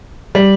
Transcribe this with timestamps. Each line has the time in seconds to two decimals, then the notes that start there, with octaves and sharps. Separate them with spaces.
0.35 G3